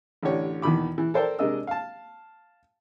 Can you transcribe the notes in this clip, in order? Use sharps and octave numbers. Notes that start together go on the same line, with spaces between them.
A1 D3 G4 C#5 D5
E2 B2 D#3 F#4 B5 D6
E3
A4 A#4 C5 D5 G5 A5
C3 G#3 D4 A#4 D#5 E6
F5 A5